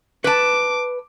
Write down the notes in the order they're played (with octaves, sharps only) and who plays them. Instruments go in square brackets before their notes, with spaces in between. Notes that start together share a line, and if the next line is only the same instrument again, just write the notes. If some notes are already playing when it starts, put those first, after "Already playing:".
[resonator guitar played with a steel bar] B4 A5 [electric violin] D6